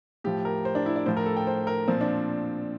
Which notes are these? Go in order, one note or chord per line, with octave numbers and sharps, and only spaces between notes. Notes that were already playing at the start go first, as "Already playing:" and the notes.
A2 F3 G4
A#4
C5
D4
E4
D5
A2 F3 C5
A#4
A4
G5
C5
A#4
A#2 F3 C4
D4